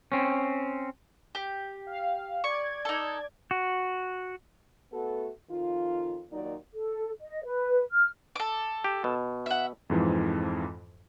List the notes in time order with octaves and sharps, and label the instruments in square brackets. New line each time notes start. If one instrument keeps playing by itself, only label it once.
[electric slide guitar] C4 C#4
[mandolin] G4
[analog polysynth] F5
[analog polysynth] D5 G#6 [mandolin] C#6
[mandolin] D#4 A4
[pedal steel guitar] F#4
[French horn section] A3 B3 F#4 A4
F2 D#3 F4
D#2 A#2 F#3 D#4 D5
[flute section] A4
D#5
B4
F6
[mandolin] A4 D6
[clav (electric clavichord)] G4
B2
[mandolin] E5 F#5
[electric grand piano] F2 G#2 E3 F3